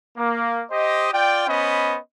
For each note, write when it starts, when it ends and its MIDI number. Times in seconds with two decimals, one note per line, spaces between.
0.17 0.64 58
0.71 1.11 67
0.71 1.11 72
0.71 1.11 75
1.13 1.46 65
1.13 1.46 74
1.13 1.46 79
1.47 1.98 59
1.47 1.98 61
1.47 1.98 72
1.47 1.98 75
1.47 1.98 83